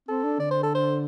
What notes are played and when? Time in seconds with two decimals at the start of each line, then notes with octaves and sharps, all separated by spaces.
0.08 C4 A4
0.24 D4
0.39 D3 D5
0.51 C5
0.63 A4
0.75 C5